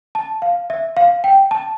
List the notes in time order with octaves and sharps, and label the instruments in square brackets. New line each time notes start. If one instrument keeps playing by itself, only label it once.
[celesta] A5
F5
E5
F5
G5
A5